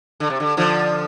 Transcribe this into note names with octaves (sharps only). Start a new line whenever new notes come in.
D3
C3
D3
D3 F3